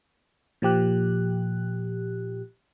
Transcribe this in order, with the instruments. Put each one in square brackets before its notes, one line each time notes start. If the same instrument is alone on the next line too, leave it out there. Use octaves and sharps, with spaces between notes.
[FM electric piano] A#2 F3 G4 F#6